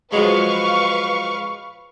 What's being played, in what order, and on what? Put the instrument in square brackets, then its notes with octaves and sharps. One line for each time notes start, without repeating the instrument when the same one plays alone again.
[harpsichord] F3 F#3 G#3 [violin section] B4 F5 C#6